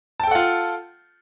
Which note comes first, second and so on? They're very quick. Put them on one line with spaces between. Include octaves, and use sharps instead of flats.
A5 G5 A4 F#5 F4